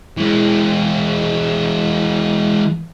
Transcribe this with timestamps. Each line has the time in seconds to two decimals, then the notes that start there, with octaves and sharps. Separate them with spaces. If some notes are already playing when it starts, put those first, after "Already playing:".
0.17 E3 G#3